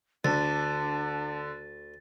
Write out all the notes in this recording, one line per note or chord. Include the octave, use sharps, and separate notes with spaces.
D2 D3 D4 A6